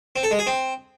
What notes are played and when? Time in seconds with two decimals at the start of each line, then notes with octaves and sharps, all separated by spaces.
0.16 C4
0.23 A4
0.31 G#3
0.39 G#4
0.47 C4